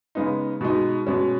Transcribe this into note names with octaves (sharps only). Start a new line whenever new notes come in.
C#3 G#3 B3 D#4
B2 G#3 D#4
B2 G#3 C#4